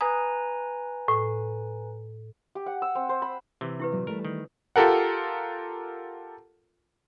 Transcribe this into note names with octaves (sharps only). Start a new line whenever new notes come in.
B4 G#5 A#5 D#6
A2
G4
F#5
E6
C4
C5
B5
C3 E3
E4 G4 B4
A#2 F#3
E3 G3 A3 A#4
D#3
F4 G4 A4 A#4 F#5